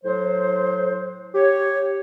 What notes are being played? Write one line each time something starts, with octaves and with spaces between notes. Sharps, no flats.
A2 F#3 C5
G4 C#5